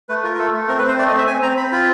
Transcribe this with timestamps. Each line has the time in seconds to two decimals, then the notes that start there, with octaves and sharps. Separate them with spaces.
0.09 A3 B4
0.24 F4 A#4
0.34 A#4
0.38 A3 A4
0.54 A3
0.68 C4 A#4
0.79 B4
0.83 C4 C5
0.98 A3 D5
1.08 D#5
1.13 C4
1.18 E5
1.27 C4 G#5
1.42 C4 A#5
1.57 C4 B5
1.72 F4 B5